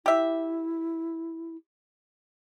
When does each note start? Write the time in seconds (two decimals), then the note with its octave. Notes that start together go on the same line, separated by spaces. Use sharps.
0.06 E4 G4 E5